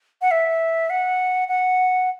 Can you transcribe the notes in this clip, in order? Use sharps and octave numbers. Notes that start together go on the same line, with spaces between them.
F#5
E5
F#5
F#5